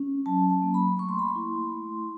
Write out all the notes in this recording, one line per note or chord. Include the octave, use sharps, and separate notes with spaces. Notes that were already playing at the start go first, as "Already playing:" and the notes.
Already playing: C#4
F#3 A5
A5
A#3
B5
A3 C#6
C6
B5
C6
E4
A3